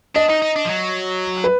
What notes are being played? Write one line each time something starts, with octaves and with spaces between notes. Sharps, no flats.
D4 D#5
D#4
D#4
D4
F3
F#3
B4